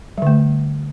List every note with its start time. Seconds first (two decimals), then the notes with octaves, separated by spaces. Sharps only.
0.18 G3
0.22 D3
0.27 A3